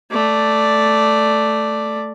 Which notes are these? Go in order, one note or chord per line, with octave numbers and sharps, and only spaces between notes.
A3 D5